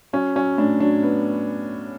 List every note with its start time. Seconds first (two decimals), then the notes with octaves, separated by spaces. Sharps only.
0.13 F#3 C#4
0.36 F#3 C#4
0.58 A2 D4
0.80 F#3 D4
1.03 B3